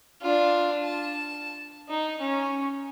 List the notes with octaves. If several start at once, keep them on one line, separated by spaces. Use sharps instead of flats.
D4 F4
A5
D#4
C#4